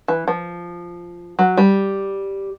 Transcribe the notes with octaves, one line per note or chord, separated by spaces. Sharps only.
E3
F3
F#3
G3